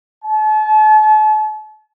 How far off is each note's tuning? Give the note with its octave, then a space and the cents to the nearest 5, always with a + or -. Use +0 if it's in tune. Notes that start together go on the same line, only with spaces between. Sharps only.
A5 -40